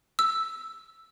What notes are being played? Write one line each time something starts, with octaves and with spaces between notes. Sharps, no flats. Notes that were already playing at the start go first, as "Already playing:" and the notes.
E6